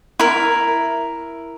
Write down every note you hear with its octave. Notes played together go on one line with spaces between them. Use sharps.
E4 A#4